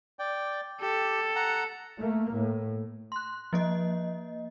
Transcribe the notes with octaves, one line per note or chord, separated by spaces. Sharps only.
D5 G5
G4 A4
F#5 A#5
A3 A#3
A2
C6 F#6
F3 A#3 D#5